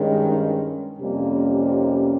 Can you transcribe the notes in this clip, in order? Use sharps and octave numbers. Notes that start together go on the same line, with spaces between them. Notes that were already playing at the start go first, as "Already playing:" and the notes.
Already playing: G2 D#3 G#3 C#4
D#4
F2 C3 G3 A#3 C#4
D#4